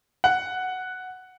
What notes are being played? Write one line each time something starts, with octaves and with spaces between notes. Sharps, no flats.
F#5